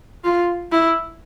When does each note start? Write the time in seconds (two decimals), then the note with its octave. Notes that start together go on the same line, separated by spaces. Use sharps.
0.24 F4
0.72 E4